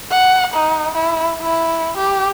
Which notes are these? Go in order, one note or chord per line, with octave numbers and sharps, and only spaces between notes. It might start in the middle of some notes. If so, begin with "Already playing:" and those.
F#5
D#4
E4
E4
G4